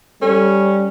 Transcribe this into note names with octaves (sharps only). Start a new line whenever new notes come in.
G3 C#4 A4